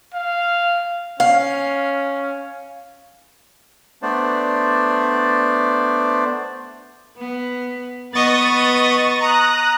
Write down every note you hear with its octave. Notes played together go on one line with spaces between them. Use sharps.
F5
C#4 F5
A3 B3 D4 C5 D5
B3
B3 B4 D#5 C#6 A6
A#5 D#6 F#6